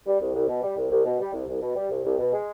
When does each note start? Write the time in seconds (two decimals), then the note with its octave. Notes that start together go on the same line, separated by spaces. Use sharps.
0.06 G3
0.20 C2
0.34 C2
0.48 B2
0.63 G3
0.77 C2
0.91 C2
1.05 B2
1.20 G3
1.33 C2
1.48 C2
1.61 B2
1.76 G3
1.90 C2
2.04 C2
2.18 B2
2.33 G#3